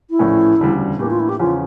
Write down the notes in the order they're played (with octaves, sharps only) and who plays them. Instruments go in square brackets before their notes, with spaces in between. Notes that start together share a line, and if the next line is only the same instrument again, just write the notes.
[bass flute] E4
[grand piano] A#1 A2 E3 A3 C#4
E1 D2 C#3 G3
[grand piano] A2 E3 A#3 D4 [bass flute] G4
[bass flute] F4
E4
G4
[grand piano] E2 C#3 F3 C#4 [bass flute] F4